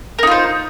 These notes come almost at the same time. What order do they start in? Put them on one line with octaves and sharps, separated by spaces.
A#4 D#4 F4 C5